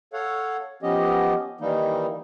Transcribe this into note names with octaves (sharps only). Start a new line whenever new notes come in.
A4 C#5 F5 F#5
F3 B3 C#4 G4 D#5
D#3 E3 G3 A#3 D#4